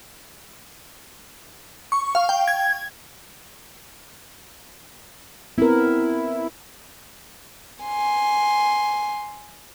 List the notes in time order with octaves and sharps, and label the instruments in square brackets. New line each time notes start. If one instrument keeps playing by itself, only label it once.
[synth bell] C#6
F5
G5
G#6
[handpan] B3 C4 A#4 [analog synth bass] E4
[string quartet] G#5 C6